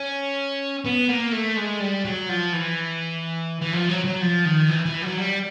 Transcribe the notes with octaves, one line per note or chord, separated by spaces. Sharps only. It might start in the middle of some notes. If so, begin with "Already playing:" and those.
Already playing: C#4
B3
A#3
A3
G#3
G3
F#3
F3
E3
E3
F3
F#3
F#3
F3
D#3
E3
E3
F#3
G3